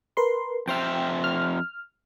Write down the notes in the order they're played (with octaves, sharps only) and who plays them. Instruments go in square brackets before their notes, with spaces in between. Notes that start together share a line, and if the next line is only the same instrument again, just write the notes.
[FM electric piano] A#4 B4 C6
[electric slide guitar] F2 C5 E5 [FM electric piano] G5 F6
[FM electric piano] F6